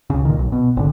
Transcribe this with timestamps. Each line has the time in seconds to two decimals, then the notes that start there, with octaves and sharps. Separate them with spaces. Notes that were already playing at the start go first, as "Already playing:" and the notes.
0.10 C#2 C#3
0.25 A#2 D#3
0.39 B1
0.52 B2
0.77 G#1 D3